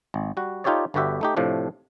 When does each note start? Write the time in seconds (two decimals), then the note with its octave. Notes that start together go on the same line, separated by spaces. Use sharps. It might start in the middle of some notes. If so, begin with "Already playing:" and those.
0.14 G#1
0.37 G3 F#4
0.64 D#4 F4 G4 A4 C#5 D5
0.94 G1 D3 B3 F#4 G4 E5
1.21 A3 D#4 G4
1.37 A2 C3 F3 A3 D4